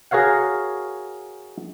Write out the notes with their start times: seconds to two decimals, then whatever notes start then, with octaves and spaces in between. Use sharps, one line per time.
0.11 F#4 G#4 A#4 C#5 F5 F#5